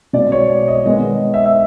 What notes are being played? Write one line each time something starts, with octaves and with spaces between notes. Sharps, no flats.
B2 G#3 C4 D5
C#5
D5
D#5
D#3 G#3 B3 D#5
E5
E5